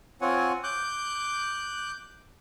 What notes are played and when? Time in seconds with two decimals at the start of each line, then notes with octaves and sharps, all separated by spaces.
0.21 C4 F4 C#5 F#5 G#5
0.64 D6 F#6 G6